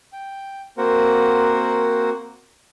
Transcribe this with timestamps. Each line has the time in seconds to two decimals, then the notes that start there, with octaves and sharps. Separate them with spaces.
0.13 G5
0.78 A#3 C4 F#4 A#4 C5 F#5